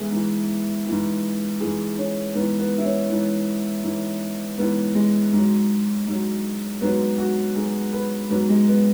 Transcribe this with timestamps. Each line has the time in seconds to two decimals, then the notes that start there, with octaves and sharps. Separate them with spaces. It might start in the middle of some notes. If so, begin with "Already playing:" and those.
Already playing: G#2 E3 B3 E4 G#4
0.11 G#2 E3
0.86 E3
0.91 G#2
1.60 G#2 E3 G#4
1.98 C#4
2.35 G#2 E3 B3
2.60 B3
2.78 E4
2.85 C#4
3.10 G#2 E3
3.84 G#2 E3
4.58 G#2 E3 B3
4.95 G#3
5.33 G#2 F#3
6.07 G#2 F#3
6.81 G#2 F#3 B3
7.18 F#4
7.55 G#2 F#3 G#4
7.93 B4
8.30 G#2 F#3 B3
8.49 G#3
8.68 B3